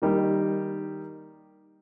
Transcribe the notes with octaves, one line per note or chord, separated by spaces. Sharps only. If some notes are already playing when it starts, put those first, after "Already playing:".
D#3 G3 A#3 D#4 G4